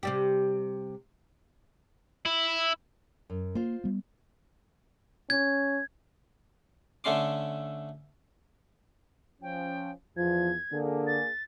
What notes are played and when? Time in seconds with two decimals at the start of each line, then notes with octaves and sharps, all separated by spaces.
0.03 C3 G3 G4
2.26 E4
3.30 F#2
3.55 A#3 F4 C5
3.84 G3 B3
5.30 C#4 G#6
7.04 D3 A3 C#4 C6 D6
9.42 F3 C#4 G5
10.17 E2 F3 G#6
10.73 D3 A#3 D4 G#4
11.07 A6